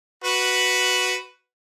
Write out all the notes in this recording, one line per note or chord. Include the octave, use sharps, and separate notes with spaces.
F#4 B4